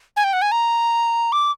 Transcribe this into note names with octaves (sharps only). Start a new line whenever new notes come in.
G#5
G5
F#5
G#5
A#5
D6